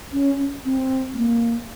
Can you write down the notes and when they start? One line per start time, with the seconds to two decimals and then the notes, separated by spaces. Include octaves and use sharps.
0.13 C#4
0.65 C4
1.14 A3
1.17 A#3